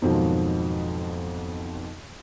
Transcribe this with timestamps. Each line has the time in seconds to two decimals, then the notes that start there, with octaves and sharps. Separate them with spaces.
0.02 F2 G#2 B2 D#3 F3 F#3